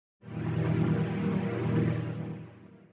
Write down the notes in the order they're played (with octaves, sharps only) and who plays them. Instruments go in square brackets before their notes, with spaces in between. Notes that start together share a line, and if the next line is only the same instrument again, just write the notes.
[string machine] F#2 A#2 D#3 E3 G3